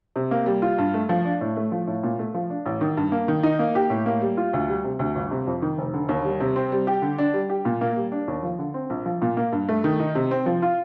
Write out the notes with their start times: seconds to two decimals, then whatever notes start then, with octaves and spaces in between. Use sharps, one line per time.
0.16 C3
0.31 A#3
0.46 G3
0.62 F4
0.78 G2
0.94 A3
1.09 F3
1.25 D4
1.41 A2
1.57 A3
1.72 F3
1.87 A2
2.03 A#2
2.19 A3
2.34 F3
2.50 D4
2.66 A1
2.81 D#3
2.97 G2
3.12 A#3
3.28 D#3
3.43 D#4
3.59 A#3
3.75 G4
3.90 A2
4.06 A#3
4.22 G3
4.37 F4
4.53 D2
4.69 G3
4.84 C3
4.99 D2
5.15 G1
5.31 C3
5.47 F2
5.62 D#3
5.78 F1
5.94 D3
6.09 D#2
6.25 G3
6.40 C3
6.56 C4
6.72 G3
6.87 G4
7.02 D3
7.18 D4
7.34 G3
7.50 G4
7.65 A#2
7.81 A#3
7.97 G3
8.12 D4
8.28 D#2
8.43 F3
8.59 D3
8.74 C4
8.90 A#1
9.06 F3
9.22 A#2
9.37 A#3
9.52 G2
9.69 A3
9.84 D#3
10.00 D#4
10.15 C3
10.31 C4
10.46 F3
10.62 F4